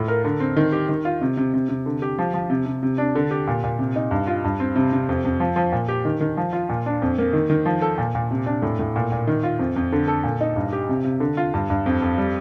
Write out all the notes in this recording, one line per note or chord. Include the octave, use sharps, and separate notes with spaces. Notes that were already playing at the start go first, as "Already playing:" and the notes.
Already playing: A2 F4
A#4
D3
C4
D#3
G4
D#3
F4
C3
C3
C3
C3
D3
G4
F3
F3
C3
C3
C3
D4
D3
G4
A#2
A#2
C3
D#4
G2
F4
G2
C4
C3
C3
F2
F2
F3
F3
A#2
G4
D#3
D#3
F3
F4
A#2
D4
F2
A#3
D#3
D#3
F3
A4
A#2
A#2
C3
D4
A2
A2
A#2
A#2
D#3
F4
F2
F2
D3
A4
A#2
D#4
G2
G4
C3
C3
D3
F4
G2
G2
F2
F2
G3